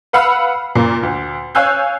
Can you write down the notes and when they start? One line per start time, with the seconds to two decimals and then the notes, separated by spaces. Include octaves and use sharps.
0.13 B4 F5 F#5 B5 E6 F6
0.75 A#2 A#3
1.03 D2
1.55 C#5 F5 G#5 E6 F#6 G6